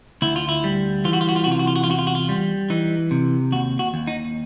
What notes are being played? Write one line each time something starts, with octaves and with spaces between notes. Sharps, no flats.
D2 E4
F4
E4
G3
E3 F4
F#4
F4
F#4
F4
F#4
C3
F4
F#4
F4
F#4
F4
E2 F#4
F4
F#4
F4
G3
E3 D#4
C3
D#2 F#4
F#4
D#2
D#4